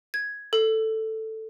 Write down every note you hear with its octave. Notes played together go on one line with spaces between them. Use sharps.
G#6
A4